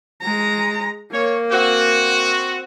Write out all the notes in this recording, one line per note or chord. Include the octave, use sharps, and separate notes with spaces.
G#3 A#5
A#3 C#5
C4 F#4